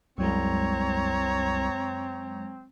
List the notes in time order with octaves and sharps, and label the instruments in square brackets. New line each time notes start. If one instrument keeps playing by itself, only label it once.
[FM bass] C2 [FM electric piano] F#2 F#3 G#3 [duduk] C4 [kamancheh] C#5 A#5